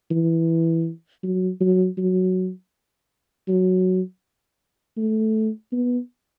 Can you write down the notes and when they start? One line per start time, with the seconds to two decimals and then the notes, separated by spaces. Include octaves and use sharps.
0.11 E3
1.23 F#3
1.61 F#3
1.98 F#3
3.48 F#3
4.97 A3
5.72 B3